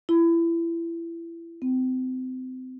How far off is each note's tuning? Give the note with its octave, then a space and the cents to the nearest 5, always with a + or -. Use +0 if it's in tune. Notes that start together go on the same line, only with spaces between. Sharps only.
E4 +25
C4 -30